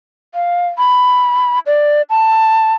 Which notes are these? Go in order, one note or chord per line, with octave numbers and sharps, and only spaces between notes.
F5
B5
D5
A5